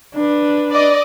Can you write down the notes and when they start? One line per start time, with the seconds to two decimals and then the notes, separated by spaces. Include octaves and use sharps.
0.15 D4 B4
0.73 D5 D#5